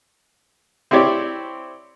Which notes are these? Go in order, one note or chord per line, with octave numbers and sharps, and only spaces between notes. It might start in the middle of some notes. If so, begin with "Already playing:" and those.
C4 E4 G4 C#5 D5